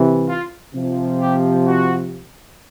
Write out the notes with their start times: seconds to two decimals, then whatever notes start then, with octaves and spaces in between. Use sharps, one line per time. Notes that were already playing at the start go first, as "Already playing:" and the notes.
Already playing: C3 E3
0.29 F4
0.75 C3 F3
1.20 G4
1.66 F#4